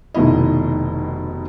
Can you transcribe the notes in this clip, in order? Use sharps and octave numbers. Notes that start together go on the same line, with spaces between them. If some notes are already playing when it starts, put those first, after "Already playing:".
F1 B2 D#3 E4 D#5